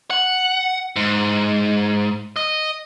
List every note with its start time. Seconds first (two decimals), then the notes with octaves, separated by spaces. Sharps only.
0.10 F#5
0.96 G#2
2.36 D#5